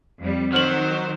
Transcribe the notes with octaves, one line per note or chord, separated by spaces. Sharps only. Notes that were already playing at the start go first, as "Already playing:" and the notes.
F2 G3
D#3 F#3 C5 F6 F#7